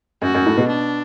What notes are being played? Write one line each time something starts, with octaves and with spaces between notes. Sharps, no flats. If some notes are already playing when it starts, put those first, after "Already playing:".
F#2 F#4
F#2
A2
B2
D4